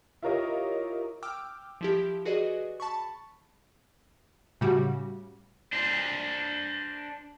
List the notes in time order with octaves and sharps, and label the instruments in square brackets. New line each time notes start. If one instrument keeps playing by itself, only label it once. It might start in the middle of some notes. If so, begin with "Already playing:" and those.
[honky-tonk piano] E4 F4 G4 A#4 C#5 D#5
[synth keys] G5 D6 E6 F6
F3 E4 G4
F#4 G#4 B4 D5 D#5
A5 B5 C#6
[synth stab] A2 C#3 G3 F#4
[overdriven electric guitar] D4 C5